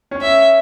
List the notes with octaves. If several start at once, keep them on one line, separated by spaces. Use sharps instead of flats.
C#4
E5